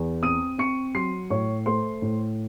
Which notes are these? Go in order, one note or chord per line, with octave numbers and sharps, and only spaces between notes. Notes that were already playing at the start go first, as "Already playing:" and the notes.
Already playing: E2
C4 D#6 D#7
C4 C#6 C#7
F#3 C6 C7
A2 C#5 C#6
A3 C5 C6
A2